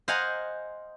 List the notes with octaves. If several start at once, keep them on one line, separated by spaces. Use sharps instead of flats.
C5 D#5 F5 F#5 G#5 A#5